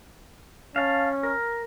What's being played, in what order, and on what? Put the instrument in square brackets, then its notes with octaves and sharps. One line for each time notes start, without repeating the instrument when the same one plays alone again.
[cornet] C#4 [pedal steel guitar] F5 A5
[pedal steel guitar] A#4